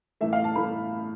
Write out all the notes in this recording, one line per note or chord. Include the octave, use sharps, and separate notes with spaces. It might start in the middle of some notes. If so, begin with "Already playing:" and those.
A2 E3 A3 E5
F5
A5
A2 E3 A3 B5